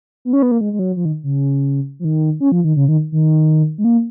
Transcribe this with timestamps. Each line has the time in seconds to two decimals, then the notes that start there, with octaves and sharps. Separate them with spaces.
0.25 B3
0.33 C#4
0.42 B3
0.51 A#3
0.61 G#3
0.73 G#3
0.79 F#3
0.96 F3
1.05 D#3
1.24 C#3
2.00 F3
2.05 D#3
2.40 C#4
2.52 F3
2.64 D#3
2.76 C#3
2.88 D#3
3.12 D#3
3.78 G#3
3.84 A#3